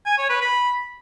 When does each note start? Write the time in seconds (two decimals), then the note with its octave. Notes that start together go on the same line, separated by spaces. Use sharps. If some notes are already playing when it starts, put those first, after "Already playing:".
0.06 G#5
0.18 C#5
0.30 B4
0.41 B5